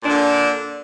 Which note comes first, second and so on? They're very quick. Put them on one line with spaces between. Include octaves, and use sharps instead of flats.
A#2 D4 D3